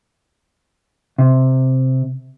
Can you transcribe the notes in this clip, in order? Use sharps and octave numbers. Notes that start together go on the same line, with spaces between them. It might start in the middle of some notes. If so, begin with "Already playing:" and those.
C3